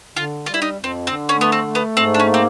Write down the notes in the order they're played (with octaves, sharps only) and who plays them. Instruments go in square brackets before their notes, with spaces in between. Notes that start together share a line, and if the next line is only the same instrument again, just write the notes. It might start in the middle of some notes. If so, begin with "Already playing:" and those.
[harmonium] D3 [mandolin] F4
[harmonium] G3 [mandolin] F4
[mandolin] E4
D#4
[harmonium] F2
[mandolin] C4
[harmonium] D3 [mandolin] C4
[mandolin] C#4
[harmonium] A3 [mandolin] B3
[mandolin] C4
[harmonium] A3
[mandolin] B3
[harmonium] G#2 [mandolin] C4
[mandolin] D4
C#4
[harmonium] A#3
[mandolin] C4